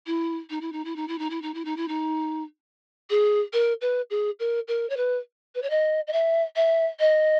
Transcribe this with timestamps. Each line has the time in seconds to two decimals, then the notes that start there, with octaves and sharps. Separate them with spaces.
0.06 E4
0.50 D#4
0.61 E4
0.72 D#4
0.85 E4
0.96 D#4
1.08 E4
1.19 D#4
1.30 E4
1.42 D#4
1.54 E4
1.65 D#4
1.77 E4
1.88 D#4
3.10 G#4
3.53 A#4
3.81 B4
4.10 G#4
4.40 A#4
4.68 A#4
4.90 C#5
4.97 B4
5.55 B4
5.62 C#5
5.70 D#5
6.07 D#5
6.13 E5
6.56 E5
7.00 D#5